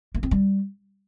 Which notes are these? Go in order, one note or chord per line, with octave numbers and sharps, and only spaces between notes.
A#3
C4
G3